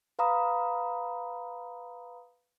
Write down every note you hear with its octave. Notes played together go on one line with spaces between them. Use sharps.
B4 F5 A#5 B5 D#6